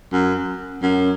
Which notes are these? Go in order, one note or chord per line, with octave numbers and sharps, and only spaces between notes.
F#2
F#2